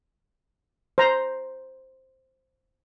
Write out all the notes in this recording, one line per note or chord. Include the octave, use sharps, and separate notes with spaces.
C5 A#5